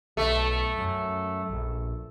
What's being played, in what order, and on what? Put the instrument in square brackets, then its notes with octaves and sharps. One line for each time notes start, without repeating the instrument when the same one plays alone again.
[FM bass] B1 [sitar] A3
[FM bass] F#2
A#1